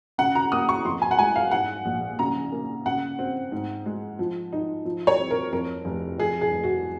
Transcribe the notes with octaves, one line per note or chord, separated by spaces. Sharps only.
C#3 F#5
A#5
A#3 D#6
C#6
F2 C6
G#5
F#5
G#3 G#5
F5
G#2 F#5
A#1
C#3 A#5
A#3
C#3 F#5
C4
G#2
G#3
F3
D#4
F3
C#5
C4
A#4
F2 A#4
F1
F2 G#4
G#4
F1
F#4